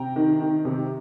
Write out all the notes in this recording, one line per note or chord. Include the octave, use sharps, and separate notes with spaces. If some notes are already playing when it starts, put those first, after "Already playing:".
Already playing: C3 G5 A#5
D#3
D#3
C3